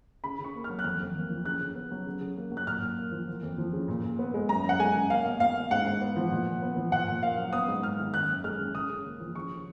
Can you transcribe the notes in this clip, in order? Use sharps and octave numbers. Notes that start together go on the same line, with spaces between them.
C#3 B5
C#3
C#6
A#3
F6
F#3
F#6
F2 F6
F2
A#3
F3
C#3 F#6
C#3
B3
F#3
C#3
C#3
A#3
F#3
F#6
A#2 F6
A#2
A#3
F3
A#3
F2
F3
C#3
A#2
A#2
B3
G#3
F#2 A#5
F#2 F#5
G#3 G#5
C#3
A#3 F5
B2
B2 F5
A#3
G#2 F#5
G#2
B3
F3
A#2
A#2
B3
F3
A#2 F#5
A#2
A#3 F5
F#3
B3 D#6
G#2
G#3 F6
D#3
F#2 F#6
F#2
G#3 F6
C#3
C#3 D#6
C#3
A#3
F3
C#3 C#6
C#3